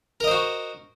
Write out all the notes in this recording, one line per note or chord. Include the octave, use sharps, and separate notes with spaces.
F#4 A#4 C5 D#5